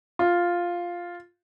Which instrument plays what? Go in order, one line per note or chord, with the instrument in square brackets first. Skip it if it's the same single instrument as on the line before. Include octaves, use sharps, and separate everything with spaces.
[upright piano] F4